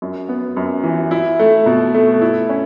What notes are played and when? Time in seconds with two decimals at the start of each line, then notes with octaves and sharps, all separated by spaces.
0.02 F#2
0.29 B3
0.57 F#2
0.84 E3
1.11 E4
1.39 A3
1.66 B2
1.95 A3
2.22 E4
2.49 C#4